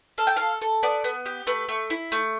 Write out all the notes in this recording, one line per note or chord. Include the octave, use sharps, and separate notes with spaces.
A4 F5
G5
A4 F5
A4
B3 D5
B3
G4
A3 B4
A3
E4
A3